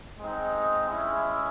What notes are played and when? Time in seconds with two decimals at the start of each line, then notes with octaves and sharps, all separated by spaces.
0.19 G#3 C4 D#4
0.89 G#3 C#4 E4